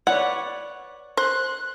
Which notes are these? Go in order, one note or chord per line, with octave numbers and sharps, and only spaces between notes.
B4 C#5 D5 F#5
C5 F#6